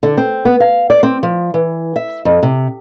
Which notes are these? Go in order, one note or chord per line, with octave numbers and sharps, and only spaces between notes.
D3
C4
B3
F5
D5
C4
F3
E3
E5
F2
C3